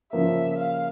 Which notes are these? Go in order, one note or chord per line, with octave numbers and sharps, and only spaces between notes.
C#3 F3 A#3 E5
F5